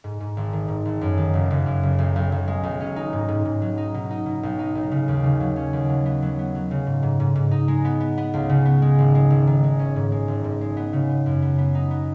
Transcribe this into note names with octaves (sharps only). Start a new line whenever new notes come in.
G#2
G#2
G#1
D#3
G#2
G#1
F#2
D#3
F#1
F#1
F#2
F#1
B1
B1
B1
G#3
B1
C#4
D#4
G#2
G#2
G#2
F#3
D#4
B2
D#4
B2
B1
D#4
B1
C#3
D#2
C#3
F#3
C#4
D#2
F#3
B3
F#3
B3
F#3
C#3
G#2
G#2
G#2
G#2
D#4
G#3
B3
B3
B3
C#2
C#3
B3
G#3
G#1
G#3
G#1
D#3
G#3
C#4
G#2
G#3
G#1
G#2
G#3
B3
C#3
B3
F#2
B3
B3
D#4
B3